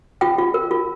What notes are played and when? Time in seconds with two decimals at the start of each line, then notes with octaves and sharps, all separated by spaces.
0.21 F4 G5
0.38 F4
0.54 A#4
0.71 F4